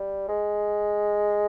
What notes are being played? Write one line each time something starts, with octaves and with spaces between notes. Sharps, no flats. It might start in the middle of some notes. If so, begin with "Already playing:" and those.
Already playing: G3
G#3